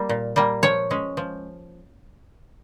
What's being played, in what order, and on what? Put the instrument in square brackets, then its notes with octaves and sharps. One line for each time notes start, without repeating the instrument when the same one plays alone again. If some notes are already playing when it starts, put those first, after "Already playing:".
Already playing: [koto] G3 A#3
A#2
G3 A#3
F3 C#5
G#3 C#4
F3